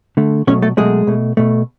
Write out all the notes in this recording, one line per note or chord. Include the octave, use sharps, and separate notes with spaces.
D3 A3
B2 F#3 A3 C#4 C#5
A3 A4
B2 F#3 G#3 A3 G#4
B2 A3
B2 A3